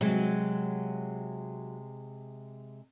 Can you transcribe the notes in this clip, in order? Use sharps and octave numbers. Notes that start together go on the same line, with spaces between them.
C3 F#3 G#3